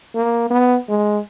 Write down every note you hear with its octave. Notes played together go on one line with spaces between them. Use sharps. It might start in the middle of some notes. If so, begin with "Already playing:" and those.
A#3
B3
G#3